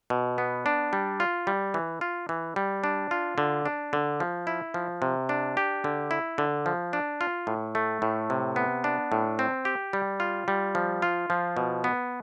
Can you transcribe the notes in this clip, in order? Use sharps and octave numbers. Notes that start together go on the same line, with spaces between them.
B2
B3
D4
G3
F4
G3
E3
F4
E3
G3
D4
F4
D3
D4
D3
F3
E4
F3
C3
D4
G4
D3
E4
D3
F3
D4
F4
A2
A3
A2
C3
B3
D4
A2
C4
G4
G3
F4
G3
F3
F4
F3
B2
B3